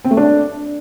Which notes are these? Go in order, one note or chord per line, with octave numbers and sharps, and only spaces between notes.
C4
A3
D4